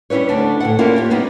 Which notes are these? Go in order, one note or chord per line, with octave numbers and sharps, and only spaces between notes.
G3 C#4 E4 B4 C#5
D2 D4
A2 A4 F#5
A#3 C#4 D4 E4 F4 A#4
F4 G4
G3 A#3 B3 D#4 E4